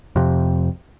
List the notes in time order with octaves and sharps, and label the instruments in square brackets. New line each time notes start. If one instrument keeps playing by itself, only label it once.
[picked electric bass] F2 C3